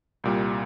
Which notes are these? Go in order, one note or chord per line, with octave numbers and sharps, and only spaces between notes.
C2 A#2 G3